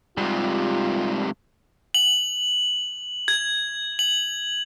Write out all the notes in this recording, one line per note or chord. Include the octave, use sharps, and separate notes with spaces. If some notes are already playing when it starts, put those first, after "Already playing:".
G#2 C3 G3 F4
F#7
G#6
F#7